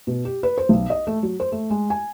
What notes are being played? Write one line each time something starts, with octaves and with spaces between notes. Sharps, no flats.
B2
G4
B4
C5
B1
D#5
A3
F#3
C5
A3
G#3
G#5